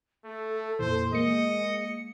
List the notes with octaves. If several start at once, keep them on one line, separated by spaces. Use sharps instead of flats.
A3 A4
F2 A#2 E3 C5
G#3 A#3 D#5 C#7